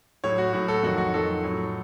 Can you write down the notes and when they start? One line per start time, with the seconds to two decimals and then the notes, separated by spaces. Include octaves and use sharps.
0.24 A2 F#3 C#5
0.38 F#4
0.53 A2 F#3 F#4
0.68 A4
0.83 F2 D#3 F#3 F#4
0.98 F#4
1.14 F2 D#3 F#3 A4
1.44 A2 F#3